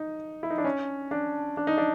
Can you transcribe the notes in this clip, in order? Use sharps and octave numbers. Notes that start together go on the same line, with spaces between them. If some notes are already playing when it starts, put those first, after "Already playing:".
Already playing: D#4
E4
D#4
D4
C#4
D4
D4
D#4
D4